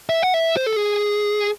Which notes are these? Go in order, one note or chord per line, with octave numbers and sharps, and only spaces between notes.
E5
F#5
E5
C5
A4
G#4